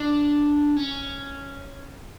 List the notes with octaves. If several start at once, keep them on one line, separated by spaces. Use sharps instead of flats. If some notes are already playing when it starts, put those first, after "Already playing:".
Already playing: D4
C#4